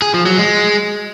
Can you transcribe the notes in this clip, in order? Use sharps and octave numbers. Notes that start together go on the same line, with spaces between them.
G#4
F3
F#3
G#3